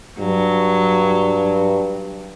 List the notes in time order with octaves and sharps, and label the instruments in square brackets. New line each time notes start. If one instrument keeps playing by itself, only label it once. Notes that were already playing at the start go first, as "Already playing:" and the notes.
[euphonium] G2 [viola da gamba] F#3